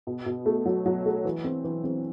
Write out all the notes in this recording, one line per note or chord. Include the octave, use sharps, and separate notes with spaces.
B2
B2
A3
F#3
F#3
A3
E3
C4
E3
C4